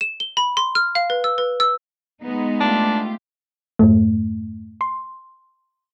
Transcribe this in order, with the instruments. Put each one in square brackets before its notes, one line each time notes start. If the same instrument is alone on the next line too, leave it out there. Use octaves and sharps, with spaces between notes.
[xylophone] E7
G7
B5
C6
F6
F5
B4
E6
B4
E6
[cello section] G#3 B3 D#4
[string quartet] A3 F4 G4 [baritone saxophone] D4
[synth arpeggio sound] F2 G#2 A3
C6